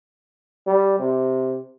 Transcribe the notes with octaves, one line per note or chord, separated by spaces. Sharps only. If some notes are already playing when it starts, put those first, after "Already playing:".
G3
C3